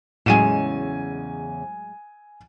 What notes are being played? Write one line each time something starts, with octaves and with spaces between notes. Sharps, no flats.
E2 A2 C#3 F#3 G#3 G#5 D#7 E7